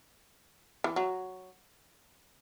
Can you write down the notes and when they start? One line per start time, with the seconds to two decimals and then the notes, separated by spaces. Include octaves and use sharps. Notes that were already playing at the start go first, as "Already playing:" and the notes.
0.84 E3
0.96 F#3